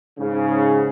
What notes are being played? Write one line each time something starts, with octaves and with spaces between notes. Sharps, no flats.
G#2 C#3